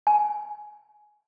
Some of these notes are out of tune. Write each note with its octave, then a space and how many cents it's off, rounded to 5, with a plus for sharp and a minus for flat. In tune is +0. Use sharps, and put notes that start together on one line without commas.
G#5 +15